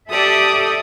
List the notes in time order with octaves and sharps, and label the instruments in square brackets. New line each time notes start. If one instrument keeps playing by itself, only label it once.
[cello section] G4 A4 E5 [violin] D5 D#6